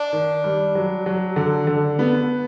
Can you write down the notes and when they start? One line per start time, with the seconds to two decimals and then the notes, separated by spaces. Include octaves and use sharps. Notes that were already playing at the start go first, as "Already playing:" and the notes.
Already playing: D4
0.13 D#3
0.44 G3
0.75 F#3
1.06 F#3
1.36 D3
1.67 D3
1.99 B3